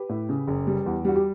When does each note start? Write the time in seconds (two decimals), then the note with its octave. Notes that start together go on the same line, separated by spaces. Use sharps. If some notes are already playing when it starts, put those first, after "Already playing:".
Already playing: G4 B4
0.09 A2
0.29 C#3
0.48 F#1
0.67 G3
0.86 E2
1.05 G3 F#4
1.16 G4